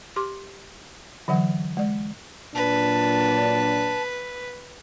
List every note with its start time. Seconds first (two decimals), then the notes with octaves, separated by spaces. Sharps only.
0.16 G4 C6 D6
1.28 D3 E3 F#3 F#5
1.77 G#3 D5
2.55 A#2 F#3 D4 B4 A5